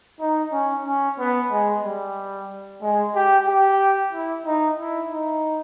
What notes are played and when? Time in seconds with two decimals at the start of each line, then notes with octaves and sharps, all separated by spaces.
0.20 D#4
0.52 C#4
0.86 C#4
1.19 B3
1.51 G#3
1.84 G3
2.82 G#3
3.15 G4
3.48 G4
4.13 E4
4.46 D#4
4.78 E4
5.11 D#4